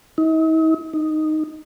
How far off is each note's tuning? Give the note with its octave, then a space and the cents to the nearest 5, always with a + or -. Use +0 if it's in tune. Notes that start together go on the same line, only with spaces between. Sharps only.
D#4 +45
D#4 -5